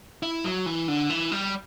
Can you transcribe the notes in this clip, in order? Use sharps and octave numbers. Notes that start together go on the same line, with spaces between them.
E4
F#3
E3
D3
E3
G3